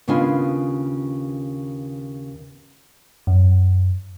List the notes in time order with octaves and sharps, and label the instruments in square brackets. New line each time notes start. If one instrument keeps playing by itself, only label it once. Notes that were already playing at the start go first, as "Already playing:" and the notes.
[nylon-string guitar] D#2 C#3 B3 D4 F4 G#5
[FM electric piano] F#2